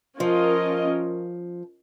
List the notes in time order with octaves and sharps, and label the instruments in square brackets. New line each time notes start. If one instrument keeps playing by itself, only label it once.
[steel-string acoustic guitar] F3 [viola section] C#4 F4 A#4 D#5